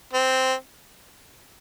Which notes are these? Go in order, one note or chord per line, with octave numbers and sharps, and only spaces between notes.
C4